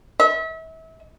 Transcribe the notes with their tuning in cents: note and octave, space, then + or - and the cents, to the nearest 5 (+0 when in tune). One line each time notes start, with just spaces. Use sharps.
E5 -35